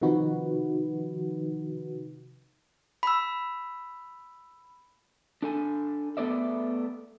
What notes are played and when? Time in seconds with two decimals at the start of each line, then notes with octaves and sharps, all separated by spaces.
0.02 C3 D#3 F3 D#4 F#4 B4
3.03 B5 E6
5.42 D4 A4 G#5
6.17 A3 B3 A4 C5 D5 E5